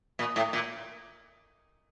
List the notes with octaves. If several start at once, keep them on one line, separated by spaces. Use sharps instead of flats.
A#2
A2
A#2